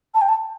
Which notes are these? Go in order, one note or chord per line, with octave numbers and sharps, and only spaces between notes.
A5
G5
A5